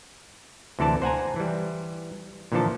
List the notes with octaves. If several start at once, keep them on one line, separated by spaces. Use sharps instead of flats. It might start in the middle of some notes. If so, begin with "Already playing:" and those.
D2 C3 E3 A4 D5 A5
C5 F#5 G#5 A#5
E3 G3
A#2 D3 E3 F3 A4 A5